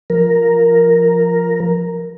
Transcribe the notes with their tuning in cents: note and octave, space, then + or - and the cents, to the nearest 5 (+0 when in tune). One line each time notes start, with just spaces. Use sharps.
F3 +0 A#4 +0